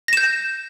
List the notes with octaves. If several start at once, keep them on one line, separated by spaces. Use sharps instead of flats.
G6 A#6 E7